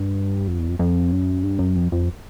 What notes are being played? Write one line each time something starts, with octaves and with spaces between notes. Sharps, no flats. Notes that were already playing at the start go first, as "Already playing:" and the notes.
Already playing: G2
F2
E2
F2
F2
F#2
G2
F#2
F2
F2